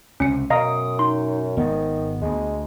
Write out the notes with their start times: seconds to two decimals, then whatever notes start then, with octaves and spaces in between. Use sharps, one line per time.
0.20 C#2 C3 C#4 C#7
0.50 F#2 B2 D#5 F5 A#5 D#6
0.99 D#4 C6
1.57 G#1 G#2 D#3 B3
2.22 D2 G#3